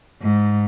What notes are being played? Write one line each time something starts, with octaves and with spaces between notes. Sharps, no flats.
G#2